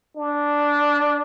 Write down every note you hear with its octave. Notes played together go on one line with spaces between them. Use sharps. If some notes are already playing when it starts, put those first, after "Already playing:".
D4